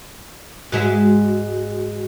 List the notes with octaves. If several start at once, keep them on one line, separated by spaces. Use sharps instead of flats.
G#2 G#3 F#4 E5